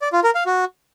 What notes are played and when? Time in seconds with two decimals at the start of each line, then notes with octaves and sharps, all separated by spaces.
0.02 D5
0.13 F4
0.24 A#4
0.35 F5
0.46 F#4